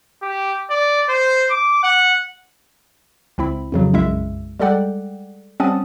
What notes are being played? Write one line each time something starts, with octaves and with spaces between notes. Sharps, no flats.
G4
D5
C5
D6
F#5
C#2 C4 E4 B5
F2 C#3 F#3
B1 F#2 G#3 E4 E5
G3 G#3 A4 D5 F#5 G5
G3 C4 C#4 F#5 A5 D#6